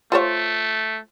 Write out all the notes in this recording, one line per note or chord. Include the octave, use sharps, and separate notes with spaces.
A3 F4 C5 C#5